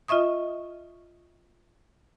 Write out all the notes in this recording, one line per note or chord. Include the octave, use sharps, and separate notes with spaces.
F4 D#5 E5 C#6 D#6